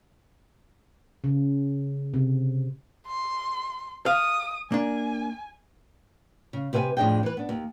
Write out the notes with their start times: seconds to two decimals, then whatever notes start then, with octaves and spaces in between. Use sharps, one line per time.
1.24 C#3
2.14 C3
3.07 C6
4.06 F5 D#6
4.72 A#3 D4 G#5
6.53 C#3
6.73 C3 G4 B4 F5 G#5
6.97 F2 A2 D4 G#4 D#5 G5
7.23 E3 B4
7.37 B3 D4
7.49 D#2